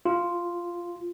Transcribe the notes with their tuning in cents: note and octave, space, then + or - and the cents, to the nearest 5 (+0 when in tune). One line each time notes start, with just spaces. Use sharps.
F4 -5